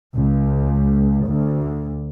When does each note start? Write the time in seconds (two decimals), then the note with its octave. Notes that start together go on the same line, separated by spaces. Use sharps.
0.15 C#2
1.26 D2